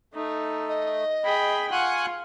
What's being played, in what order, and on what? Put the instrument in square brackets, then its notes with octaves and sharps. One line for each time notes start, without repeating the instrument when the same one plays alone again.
[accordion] A3 [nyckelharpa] D#4
[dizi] D#5
[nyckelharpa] G#4 G5 [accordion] B5
[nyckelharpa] F4 [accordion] F#5 G#5 F#6 [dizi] C#6